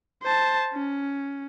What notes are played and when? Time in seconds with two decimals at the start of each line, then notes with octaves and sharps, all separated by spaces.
0.23 C5 A5
0.73 C#4